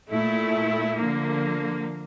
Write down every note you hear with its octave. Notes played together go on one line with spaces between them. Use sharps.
A#2 A3 E4
D3 F3 A#3